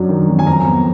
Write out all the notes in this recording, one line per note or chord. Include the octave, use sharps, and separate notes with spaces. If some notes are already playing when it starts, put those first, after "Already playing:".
Already playing: F#2 F#3 D4
D#3
F#2
G#5
F2 A#5
B3